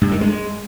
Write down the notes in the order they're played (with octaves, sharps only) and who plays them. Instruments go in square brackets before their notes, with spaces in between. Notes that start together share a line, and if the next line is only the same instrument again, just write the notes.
[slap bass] G2
D#3
G#3